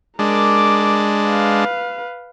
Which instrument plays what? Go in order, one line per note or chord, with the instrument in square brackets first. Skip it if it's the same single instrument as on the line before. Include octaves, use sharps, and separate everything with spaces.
[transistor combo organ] G#3 D4 [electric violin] A#4 D6
[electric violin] B4 F5